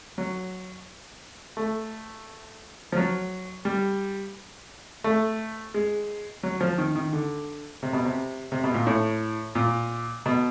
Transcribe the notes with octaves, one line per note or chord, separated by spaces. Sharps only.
F#3
A3
F3
F#3
G3
A3
G#3
F#3
F3
D#3
D#3
D3
C3
B2
C3
C3
B2
A#2
A2
A#2
B2